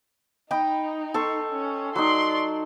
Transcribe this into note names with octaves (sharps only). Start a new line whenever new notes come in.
D#4 D#5 G5 B5
A4 C6 C#6
C#4
F#3 D#4 D5 C6